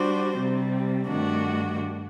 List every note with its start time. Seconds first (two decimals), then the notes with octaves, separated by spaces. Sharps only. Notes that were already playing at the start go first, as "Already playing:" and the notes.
Already playing: G3 D4 F#4 C5
0.36 C3 G3 C4
1.08 G2 D#3 A3 D4 F#4